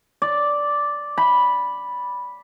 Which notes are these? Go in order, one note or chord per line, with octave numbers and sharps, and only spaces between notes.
D5
B5